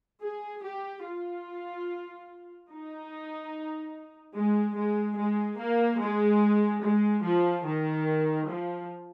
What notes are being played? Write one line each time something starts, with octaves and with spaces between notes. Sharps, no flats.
G#4
G4
F4
D#4
G#3
G#3
G#3
A#3
G#3
G#3
F3
D#3
F3